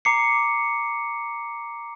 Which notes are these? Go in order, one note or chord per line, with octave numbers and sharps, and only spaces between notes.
A#5 D6 C7 C#7